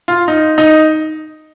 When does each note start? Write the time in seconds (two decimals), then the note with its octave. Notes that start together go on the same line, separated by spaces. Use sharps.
0.08 F4
0.28 D#4
0.58 D#4